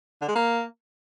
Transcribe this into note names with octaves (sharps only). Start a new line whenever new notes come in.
D3
G#3
A#3